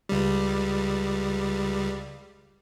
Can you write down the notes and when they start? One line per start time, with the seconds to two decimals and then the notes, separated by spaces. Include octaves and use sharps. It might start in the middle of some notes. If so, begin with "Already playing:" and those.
0.09 C#2 G3